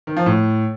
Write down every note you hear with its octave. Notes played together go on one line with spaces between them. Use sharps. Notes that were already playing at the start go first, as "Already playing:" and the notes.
D#3
F3
A2